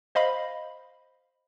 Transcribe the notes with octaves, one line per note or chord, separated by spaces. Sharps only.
C5 D#5 F5 B5